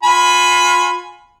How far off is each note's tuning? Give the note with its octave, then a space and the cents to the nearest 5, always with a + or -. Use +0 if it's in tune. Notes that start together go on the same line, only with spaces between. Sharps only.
F4 +30 G#5 +0 B5 +10